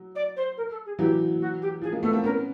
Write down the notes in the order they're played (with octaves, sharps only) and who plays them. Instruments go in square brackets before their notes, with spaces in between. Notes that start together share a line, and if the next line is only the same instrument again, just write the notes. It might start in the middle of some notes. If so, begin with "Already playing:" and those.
Already playing: [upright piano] F#3
[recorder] D5
C5
A#4
A4
G#4
[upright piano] E3 F#3 [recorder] G4
[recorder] F#4
G4
[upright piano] F3 [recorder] G#4
[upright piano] G#3 A#3
[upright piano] A3 B3 [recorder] A4
[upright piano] A#3 C4
[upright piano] B3 C#4 [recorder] A#4